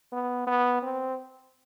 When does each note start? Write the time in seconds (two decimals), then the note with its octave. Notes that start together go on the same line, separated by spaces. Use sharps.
0.12 B3
0.47 B3
0.82 C4